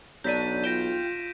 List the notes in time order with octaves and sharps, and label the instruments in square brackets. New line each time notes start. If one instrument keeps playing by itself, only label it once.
[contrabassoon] B1 [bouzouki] F#3 D4 [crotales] G6 B6 D#7
[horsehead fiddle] F4 [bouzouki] G5 [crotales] A#6 D7 E7